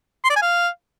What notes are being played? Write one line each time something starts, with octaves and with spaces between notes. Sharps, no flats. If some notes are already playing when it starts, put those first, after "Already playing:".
C6
D5
G#5
F5